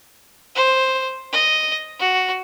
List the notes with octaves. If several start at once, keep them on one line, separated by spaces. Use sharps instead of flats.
C5
D#5
F#4